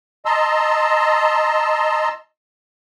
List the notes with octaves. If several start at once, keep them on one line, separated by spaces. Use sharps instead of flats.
D#5 A5 A#5 C6 E6